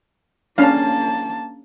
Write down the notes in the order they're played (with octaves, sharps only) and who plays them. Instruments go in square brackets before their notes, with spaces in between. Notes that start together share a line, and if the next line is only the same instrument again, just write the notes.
[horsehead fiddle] A#3 A5 [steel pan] C#4 D4 F5